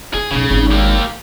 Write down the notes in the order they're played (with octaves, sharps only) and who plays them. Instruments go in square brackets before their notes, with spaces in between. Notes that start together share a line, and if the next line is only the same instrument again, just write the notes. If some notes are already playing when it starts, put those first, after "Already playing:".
[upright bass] E4 [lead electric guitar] G#4
[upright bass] B1 F#2 [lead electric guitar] C#3
[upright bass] G#1 D3
[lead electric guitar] A#3 G4